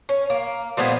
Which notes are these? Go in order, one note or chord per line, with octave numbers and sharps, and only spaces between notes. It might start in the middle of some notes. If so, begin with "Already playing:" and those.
C#4
A#3
A#2 F3 G#3 B3